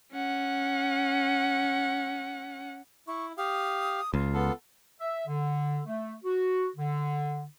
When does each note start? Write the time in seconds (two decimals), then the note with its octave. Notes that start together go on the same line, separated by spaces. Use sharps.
0.13 C#4 F#5
3.08 E4 C#6
3.38 G4 F5 D#6
4.14 C#2 F4
4.34 B3 A4
5.00 E5
5.27 D3
5.86 A3
6.24 F#4
6.76 D3